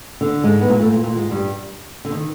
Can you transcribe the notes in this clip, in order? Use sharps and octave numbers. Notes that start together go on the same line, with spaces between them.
D3
G#2 G#3
B3
A#2 A#3
A2 A3
A#2 A#3
A#2 A#3
G#2 G#3
G2 G3
D3
D#3